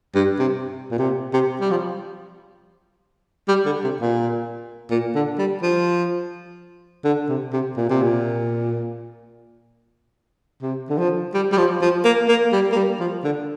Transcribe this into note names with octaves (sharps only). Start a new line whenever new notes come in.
G2
C3
A#2
C3
C3
G3
F3
G3
D3
C3
A#2
A#2
D3
G3
F3
D3
C3
C3
A#2
C3
A#2
C3
D3
F3
G3
G3
F3
F3
A#3
A#3
G3
A#3
G3
F3
D3